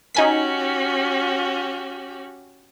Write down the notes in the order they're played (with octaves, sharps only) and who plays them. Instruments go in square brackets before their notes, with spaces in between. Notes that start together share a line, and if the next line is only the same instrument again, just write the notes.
[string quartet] C#4 F#4 G4 [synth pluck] D#4 G#5 B6